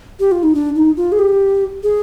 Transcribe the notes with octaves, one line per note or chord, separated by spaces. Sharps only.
G4
F4
D#4
D4
D#4
F4
G#4
G4
G#4